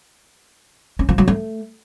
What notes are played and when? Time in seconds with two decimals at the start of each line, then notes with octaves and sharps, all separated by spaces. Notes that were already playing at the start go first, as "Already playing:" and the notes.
0.99 C#4
1.09 F3
1.18 F#3
1.28 A3